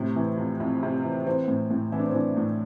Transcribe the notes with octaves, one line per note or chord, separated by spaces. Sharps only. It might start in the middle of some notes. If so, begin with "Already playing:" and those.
Already playing: A2 C3
E3
F2
F2 E4
C3
E3
E3 C4
A2
A2
E3 E4
D4
C4
E3 D4
A2